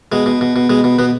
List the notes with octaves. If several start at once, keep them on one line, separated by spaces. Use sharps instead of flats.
B2 G#3
B2
B2
B2
B2 G#3
B2
B2 B3